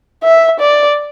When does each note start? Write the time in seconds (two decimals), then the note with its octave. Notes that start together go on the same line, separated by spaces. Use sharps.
0.23 E5
0.60 D5